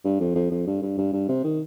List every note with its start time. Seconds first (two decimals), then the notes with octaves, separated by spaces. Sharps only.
0.04 G2
0.20 F2
0.35 F2
0.51 F2
0.67 G2
0.82 G2
0.98 G2
1.13 G2
1.28 C3
1.44 D#3